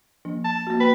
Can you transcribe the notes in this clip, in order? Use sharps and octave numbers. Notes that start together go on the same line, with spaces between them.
F3 A#3 D4
A5
A#3 F#4
B4 G5